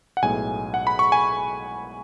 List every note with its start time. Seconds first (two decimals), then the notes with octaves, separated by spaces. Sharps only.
0.17 F#5
0.22 B1 A2 G#3 B3 G#5
0.74 F#5
0.87 B5
0.99 C#6
1.12 G#5